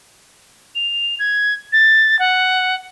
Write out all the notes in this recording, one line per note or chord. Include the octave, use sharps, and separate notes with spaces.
F7
G#6
A6
F#5